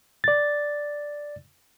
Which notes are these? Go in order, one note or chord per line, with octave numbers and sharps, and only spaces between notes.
D5 A6